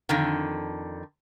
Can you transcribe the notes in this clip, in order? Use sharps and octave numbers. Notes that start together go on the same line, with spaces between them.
F2 D3 D#3